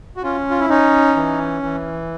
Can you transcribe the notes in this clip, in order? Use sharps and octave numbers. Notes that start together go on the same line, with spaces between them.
F#4
C#4 F4
F4
E4
C#4 D#4
E3
E3